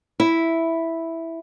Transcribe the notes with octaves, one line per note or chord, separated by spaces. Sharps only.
E4